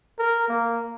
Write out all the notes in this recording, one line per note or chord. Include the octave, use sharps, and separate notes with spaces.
A#4
A#3